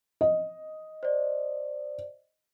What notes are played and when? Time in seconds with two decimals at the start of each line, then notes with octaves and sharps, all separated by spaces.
0.21 D#5
1.03 C5 D5